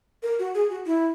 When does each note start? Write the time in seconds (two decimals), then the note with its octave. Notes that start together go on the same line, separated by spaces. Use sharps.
0.23 A#4
0.39 F#4
0.55 G#4
0.70 F#4
0.86 E4